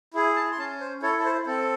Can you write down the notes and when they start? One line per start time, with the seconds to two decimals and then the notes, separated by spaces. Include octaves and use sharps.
0.14 E4 G#4
0.36 A5
0.52 C6
0.58 C#4 A5
0.80 C5
1.02 E4 A4 C#5
1.19 A4
1.24 C5
1.47 C4 A4